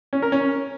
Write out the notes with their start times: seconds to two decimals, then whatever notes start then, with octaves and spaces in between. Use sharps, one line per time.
0.13 C#4
0.22 A#4
0.32 C#4